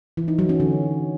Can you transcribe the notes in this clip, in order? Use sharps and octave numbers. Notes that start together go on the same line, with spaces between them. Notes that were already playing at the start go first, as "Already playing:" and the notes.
E3
D#4
F#3
C#4
D3